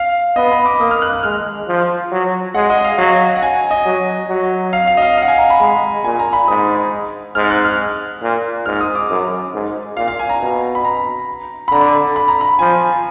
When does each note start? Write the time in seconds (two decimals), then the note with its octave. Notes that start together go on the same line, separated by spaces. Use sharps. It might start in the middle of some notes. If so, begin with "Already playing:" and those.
Already playing: F5
0.36 B3 D#5
0.52 B5
0.66 D6
0.80 A#3 D#6
0.91 F6
1.02 F#6
1.13 F#6
1.23 G#3 F6
1.68 F3
2.11 F#3
2.55 G#3 F#5
2.70 D#5
2.84 F5
2.98 F#3 F5
3.36 F#5
3.43 G#5
3.71 D#5
3.86 F#3
4.29 F#3
4.73 F5
4.87 F5
4.97 D#5
5.02 F5
5.17 F5 F#5
5.28 G#5
5.38 A#5
5.50 B5
5.60 G#3 A#5
6.04 A#2 G#5
6.19 A#5
6.33 B5
6.48 G#2 D#6
7.35 G#2 F6
7.50 F#6
7.64 F6
8.22 A#2
8.66 G#2 F6
8.81 D#6
8.95 D6
9.10 F#2
9.54 G#2
9.97 A#2 F5
10.08 F5
10.19 G#5
10.29 A#5
10.41 B2
10.75 B5
10.85 A#5
11.68 B5
11.71 D3 A#5
12.16 B5
12.28 A#5
12.41 B5
12.59 F3 G#5